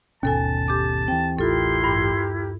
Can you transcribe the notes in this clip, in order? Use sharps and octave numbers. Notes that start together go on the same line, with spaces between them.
G#1 D#2 B2 C#4 A4 G#5 A5
G4 D6
E3 C4 G5
A1 E4 F4 G4 A4 A#4 C6
G2